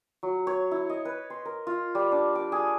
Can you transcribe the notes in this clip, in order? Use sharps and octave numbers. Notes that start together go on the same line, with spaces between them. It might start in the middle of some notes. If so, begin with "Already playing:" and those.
F#3
C#5
E4
D#5
B4
C6
A#4
F4
G3
D4
D6
G#4